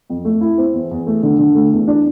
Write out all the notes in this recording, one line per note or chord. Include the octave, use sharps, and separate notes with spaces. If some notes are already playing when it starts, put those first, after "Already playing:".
F2
A3
E4
C4
E2
E2
A3
D3
D3
A3
E2
D4